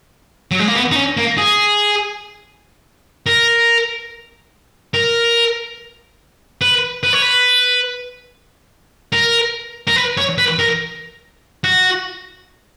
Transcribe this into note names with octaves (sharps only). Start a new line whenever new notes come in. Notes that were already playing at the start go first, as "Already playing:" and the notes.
F#3
G#3
A#3
B3
D#4
C#4
A#3
G#4
A#4
A#4
B4
B4
C#5
B4
A#4
A#4
B4
C#5
B4
A#4
F#4